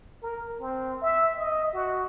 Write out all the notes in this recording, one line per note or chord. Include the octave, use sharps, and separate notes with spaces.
A#4
C4
E5
D#5
F#4